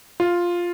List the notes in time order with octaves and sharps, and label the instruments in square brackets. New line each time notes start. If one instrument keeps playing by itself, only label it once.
[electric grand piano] F4